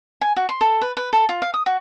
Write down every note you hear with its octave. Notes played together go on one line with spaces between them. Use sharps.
G#5
F#4
C6
A4
B4
B4
A4
F4
F5
D#6
F#4